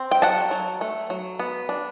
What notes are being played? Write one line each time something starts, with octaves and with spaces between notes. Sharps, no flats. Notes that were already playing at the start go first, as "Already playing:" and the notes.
Already playing: C4
G5
F#3 F#5 A5
F#3
A3
F#3
B3
D4